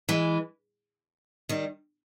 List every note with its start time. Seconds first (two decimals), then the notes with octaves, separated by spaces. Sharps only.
0.09 E3 G#3
1.49 D#3 G3